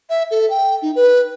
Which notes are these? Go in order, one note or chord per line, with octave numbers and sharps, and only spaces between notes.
E5
A4
G5
D#4
B4